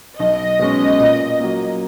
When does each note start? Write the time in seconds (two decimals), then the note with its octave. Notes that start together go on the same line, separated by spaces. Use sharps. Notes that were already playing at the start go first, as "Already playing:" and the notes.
0.19 B1 D#5
0.59 B2 G#3 C#4
1.00 A#2
1.40 F#3 A#3